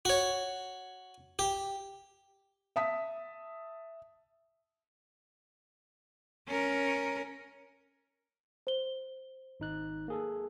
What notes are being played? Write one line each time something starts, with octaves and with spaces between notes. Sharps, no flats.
F#4 C#5
G4
E5 A5 D#6 B6
C#4 A#4
C5 G7
G#1 D#4 F#6
A#3 G#4 A4